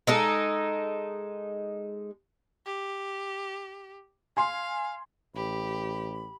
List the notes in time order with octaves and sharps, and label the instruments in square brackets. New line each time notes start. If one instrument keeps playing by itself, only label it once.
[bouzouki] G#3 D#4 A4
[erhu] G4
[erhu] F5 [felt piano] G#5 C6
[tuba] A1 [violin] G4 [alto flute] B5